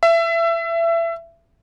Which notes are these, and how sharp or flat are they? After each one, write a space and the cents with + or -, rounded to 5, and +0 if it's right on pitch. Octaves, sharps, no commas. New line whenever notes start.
E5 +25